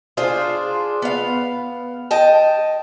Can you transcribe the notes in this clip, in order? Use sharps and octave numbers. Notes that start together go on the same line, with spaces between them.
D4 F4 G#4 C5
B3 F5
D#5 G5 A5